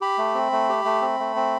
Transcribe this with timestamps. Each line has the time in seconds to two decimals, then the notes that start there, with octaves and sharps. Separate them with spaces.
0.01 G4 B5
0.18 A3
0.34 C4
0.52 A3
0.69 G4
0.85 A3
1.02 C4
1.20 A3
1.36 C4